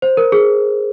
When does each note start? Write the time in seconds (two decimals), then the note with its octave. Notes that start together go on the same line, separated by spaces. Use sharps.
0.02 C5
0.17 A#4
0.32 G#4